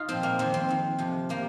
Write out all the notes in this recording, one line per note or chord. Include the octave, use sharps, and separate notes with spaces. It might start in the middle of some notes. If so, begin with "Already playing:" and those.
Already playing: D#4 F4
A#2 F3 C4
A#3
F2 D#3 C4
C4
F2 D#3
F2 C3 F3
C3 F3 A#3